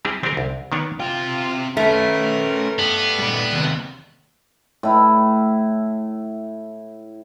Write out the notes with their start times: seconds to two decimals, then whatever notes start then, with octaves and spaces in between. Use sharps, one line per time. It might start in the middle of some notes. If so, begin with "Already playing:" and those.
0.05 G3 C4 D4 E4 G4 G#4
0.23 C4 D4 F4 G4 G#4 A#4
0.37 C2
0.72 D#3 A#3 B3 D4 B4 C#5
1.00 C3 F4 G5
1.77 A3 C#4 A#4 B4
2.79 B3 D4 G4
3.19 A#2 G3
3.53 D#2 C3
4.83 A2 E4